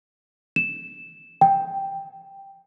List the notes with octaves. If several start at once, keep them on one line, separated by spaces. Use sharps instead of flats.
E7
G5